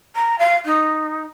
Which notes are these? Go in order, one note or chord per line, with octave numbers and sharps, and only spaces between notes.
A#5
F5
D#4